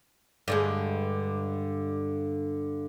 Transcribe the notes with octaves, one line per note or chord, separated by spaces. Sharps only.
G2 D3 G#3